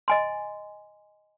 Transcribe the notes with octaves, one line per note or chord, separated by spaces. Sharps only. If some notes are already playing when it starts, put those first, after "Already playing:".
D#5 G#5 C6